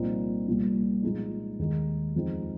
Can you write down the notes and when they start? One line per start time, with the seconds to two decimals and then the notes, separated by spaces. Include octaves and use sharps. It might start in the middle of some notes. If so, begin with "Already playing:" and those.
Already playing: C2 A#2 F3 C4 D#4
0.47 C2 A#2 F3 A#3
1.03 A#2 F3 G#3 D#4
1.59 D#2 D#3 G#3 D#4
2.15 F2 F3 G#3 C4 D#4